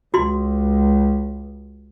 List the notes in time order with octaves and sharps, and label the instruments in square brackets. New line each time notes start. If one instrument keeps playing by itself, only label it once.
[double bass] C#2 [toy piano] F#4 C6